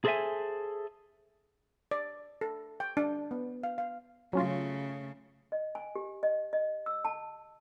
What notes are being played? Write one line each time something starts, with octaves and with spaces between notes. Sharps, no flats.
G#4 A4 C5 D5 E5 G#5
D5
A4
G5
D4
B3
F5
F5
C#3 F#3 A3 C#4 F4
D#5
G#5
G4
D#5
D#5
E6
A5